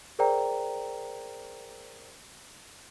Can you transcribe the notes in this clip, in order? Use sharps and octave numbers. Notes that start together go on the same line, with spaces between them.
G#4 A#4 C5 D5 G5 A#5